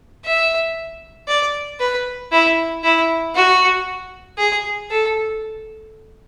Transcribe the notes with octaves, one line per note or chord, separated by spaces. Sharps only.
E5
D5
B4
E4
E4
F#4
G#4
A4